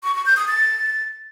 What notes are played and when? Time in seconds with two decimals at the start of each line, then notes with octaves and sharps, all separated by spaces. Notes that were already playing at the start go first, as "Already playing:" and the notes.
0.04 C#6
0.15 C#6
0.26 G6
0.37 D#6
0.48 A6